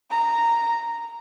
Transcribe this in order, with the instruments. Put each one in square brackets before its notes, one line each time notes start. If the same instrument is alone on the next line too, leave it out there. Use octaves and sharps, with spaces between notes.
[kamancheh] A#5